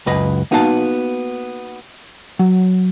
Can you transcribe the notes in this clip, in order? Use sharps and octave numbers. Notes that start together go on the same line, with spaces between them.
C#2 F#2 B4 D#5
A#3 B3 D#4 F#4 F5 A5
F#3